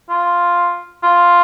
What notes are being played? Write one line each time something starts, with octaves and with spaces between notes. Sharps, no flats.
F4
F4